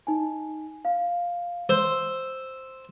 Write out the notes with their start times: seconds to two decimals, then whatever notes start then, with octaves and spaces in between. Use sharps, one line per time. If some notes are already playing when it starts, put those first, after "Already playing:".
0.07 D#4 G#5
0.85 F5
1.69 C5 E6